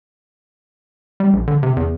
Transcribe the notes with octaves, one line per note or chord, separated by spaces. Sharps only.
G3
A#1
D3
C3
E2